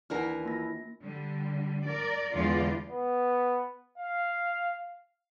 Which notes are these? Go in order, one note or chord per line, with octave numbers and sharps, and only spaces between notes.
D#2 E3 D4 E4 A#4 D5 F#5 F6
A#3 F4 A#6
D3 G3
A#4 D5
E2 D3 E3 G#3 F4 D5
B3
F5